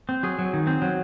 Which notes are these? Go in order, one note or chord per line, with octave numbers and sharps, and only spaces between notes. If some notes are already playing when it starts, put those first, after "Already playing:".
C4
F#3 G#4
F#3
D#3
C4
F#3